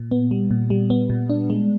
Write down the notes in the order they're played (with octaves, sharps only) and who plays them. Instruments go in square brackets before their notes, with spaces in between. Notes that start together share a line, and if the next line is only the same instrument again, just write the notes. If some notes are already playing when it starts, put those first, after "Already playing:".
Already playing: [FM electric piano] A#2
B3
G3
A#2
G3
B3
A#2
D4
G#3